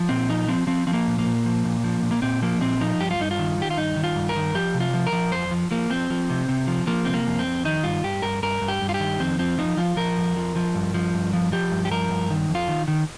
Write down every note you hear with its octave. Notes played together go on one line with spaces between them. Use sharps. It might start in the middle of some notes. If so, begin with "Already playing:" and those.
Already playing: F3
A#2 C4
F3 D#4
F3 C4
F3 C4
F3 C4
A#3
A#2
A#3
A#2
F3
A#2
F3
A#2
A#3
A#2 C4
F3 A#3
A#2 C4
F3 D#4
G2 G4
F4
G2 D#4
F4
D#3
D#3 G4
F4
G2 D#4
D#3
F4
G2
A#4
D#3
F3 G4
C3
F4
F3
A#4
F3
F2 C5
F3
F3 A#3
F3 C4
F3
C3
C3
F3
F3 A#3
C3 C4
A#3
F2
C4
F2
D#3 D#4
G2 F4
G2 G4
G2 A#4
G2 A#4
G2
G4
G2
F4
G4
D#3
F2 C4
F3 C4
F3 D#4
F3 F4
F3 A#4
F2
F3
F3
G2
F3
G2
F3
F3 G4
G2
G4
F3 A#4
G2
D#3
F2
F4
D#3
D#3